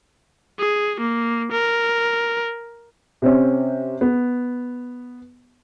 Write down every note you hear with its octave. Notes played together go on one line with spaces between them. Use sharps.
G#4
A#3
A#4
C3 C4 C#4
B3